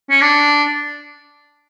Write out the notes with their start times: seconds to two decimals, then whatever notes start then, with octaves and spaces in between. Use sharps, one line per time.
0.10 C#4
0.21 D4